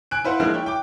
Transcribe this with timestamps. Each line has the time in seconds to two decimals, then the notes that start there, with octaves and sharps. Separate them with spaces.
0.11 G#5 F#6 D7
0.24 E4 B4 C5 F5 F#5
0.40 F3 G#3 A#3 D4 E4
0.54 E4 C#5 G5
0.66 G5 D6